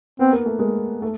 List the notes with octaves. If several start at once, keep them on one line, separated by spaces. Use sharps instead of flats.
B3 C4
A#3
A3
G#3 A#3
A3